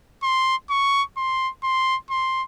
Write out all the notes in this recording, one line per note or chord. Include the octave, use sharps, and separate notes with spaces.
C6
C#6
C6
C6
C6